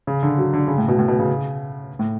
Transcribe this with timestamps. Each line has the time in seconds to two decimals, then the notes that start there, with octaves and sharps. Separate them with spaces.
0.07 C#3
0.23 D3
0.38 F#3
0.53 D3
0.68 C#3
0.78 A2
0.88 B2
0.99 A2
1.08 B2
1.19 C#3
1.99 A2